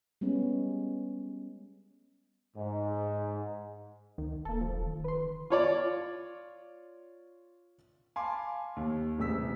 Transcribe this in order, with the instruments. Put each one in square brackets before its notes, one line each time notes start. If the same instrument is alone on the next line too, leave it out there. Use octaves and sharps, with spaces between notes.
[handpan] G3 G#3 B3 C#4
[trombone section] G#2
[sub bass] D2 [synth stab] D#3
[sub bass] D#1 [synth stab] A#3 A4
[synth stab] G1 F3
[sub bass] E1
D#3
[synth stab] B4 C6
[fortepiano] F4 C#5 D5
[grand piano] F5 G#5 A5 B5 C6 D6
D#2
D#1 A1 C3 G#4 E6 B6